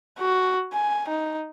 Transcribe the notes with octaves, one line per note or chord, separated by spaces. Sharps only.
F#4
G#5
D#4